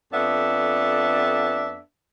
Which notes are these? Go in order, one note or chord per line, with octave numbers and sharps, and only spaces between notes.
F2 B3 D4 A4 E5